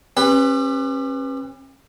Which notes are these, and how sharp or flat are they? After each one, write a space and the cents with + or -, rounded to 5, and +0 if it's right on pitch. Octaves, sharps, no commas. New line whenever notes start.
C#4 -40 G4 +30 B4 +0